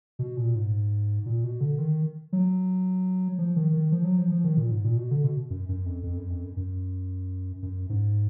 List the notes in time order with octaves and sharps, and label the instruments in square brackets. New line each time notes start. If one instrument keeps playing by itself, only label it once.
[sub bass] B2
A#2
G#2
A#2
B2
D3
D#3
F#3
F3
D#3
D#3
F3
F#3
F3
F3
D#3
A#2
G#2
A#2
B2
D3
B2
F#2
F#2
F2
F2
F#2
F2
F#2
F#2
F#2
G#2